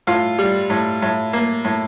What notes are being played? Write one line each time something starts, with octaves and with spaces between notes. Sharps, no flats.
A2 F4
G3
A2
A2
A#3
A2